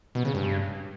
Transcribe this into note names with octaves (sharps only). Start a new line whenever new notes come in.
B2
C#3
G2